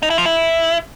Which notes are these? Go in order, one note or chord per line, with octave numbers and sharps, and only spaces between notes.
D#4
E4
F3
E4